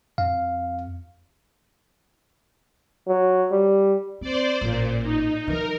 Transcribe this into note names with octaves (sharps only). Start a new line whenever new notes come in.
F2 F5
F#3
G3
C4 C5 D5
A1 A#2 A#3
D#4
E3 F#3 A#4